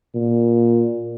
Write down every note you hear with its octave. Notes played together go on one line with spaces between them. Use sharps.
A#2